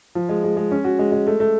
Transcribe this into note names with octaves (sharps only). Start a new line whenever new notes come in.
F3
G#3
G#3
G#3
C#4
F#4
G#3
G#3
A3
A3